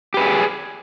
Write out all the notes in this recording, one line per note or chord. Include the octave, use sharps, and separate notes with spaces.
G4 G#4 B4